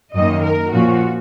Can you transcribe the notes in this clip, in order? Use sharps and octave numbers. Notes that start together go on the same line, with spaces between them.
F#2 D#3 A#3 D#5
A#4
A#2 F3 A#3 C#4 F#4